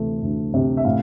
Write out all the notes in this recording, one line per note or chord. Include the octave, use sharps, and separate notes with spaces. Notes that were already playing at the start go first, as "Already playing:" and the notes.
Already playing: D2 C3 E3 A3
D2
C3
E5
A2 F5